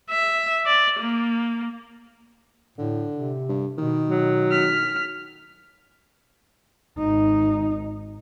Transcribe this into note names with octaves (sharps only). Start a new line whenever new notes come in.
E5
D5
A#3
A2 D3
C3
G2
B2 D#3
F#3
F6 B6
G#1 D#4